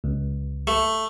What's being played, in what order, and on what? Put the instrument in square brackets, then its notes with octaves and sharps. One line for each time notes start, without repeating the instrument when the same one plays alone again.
[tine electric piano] C#2
[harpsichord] A3